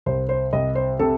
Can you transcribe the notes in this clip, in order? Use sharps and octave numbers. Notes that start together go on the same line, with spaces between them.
C2 C5
C5
C2 D#5
C5
C3 A4